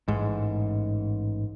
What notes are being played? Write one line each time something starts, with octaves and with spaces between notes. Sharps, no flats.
A1 G#2